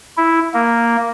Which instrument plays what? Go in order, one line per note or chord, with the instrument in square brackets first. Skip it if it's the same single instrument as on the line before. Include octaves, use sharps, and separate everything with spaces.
[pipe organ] E4
A#3